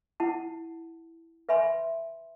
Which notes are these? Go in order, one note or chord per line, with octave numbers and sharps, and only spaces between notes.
E4 F#5 A5
B4 E5 G#5 B5 C6